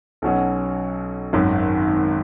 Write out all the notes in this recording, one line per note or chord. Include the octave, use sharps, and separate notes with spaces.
B1 B2 F#3 C#4
G#1 F#2 D#3